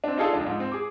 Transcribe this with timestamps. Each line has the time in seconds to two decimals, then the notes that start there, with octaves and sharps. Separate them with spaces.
0.04 C4 D4
0.18 D#4 F4 G#4 A4 D5 F5
0.33 C#2 D4
0.47 G#2
0.60 C4
0.72 G#4 D6